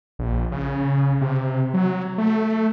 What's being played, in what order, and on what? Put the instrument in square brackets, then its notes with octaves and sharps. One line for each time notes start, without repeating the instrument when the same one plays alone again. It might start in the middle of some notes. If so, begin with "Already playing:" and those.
[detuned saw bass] A#1
C#3
C3
F#3
A3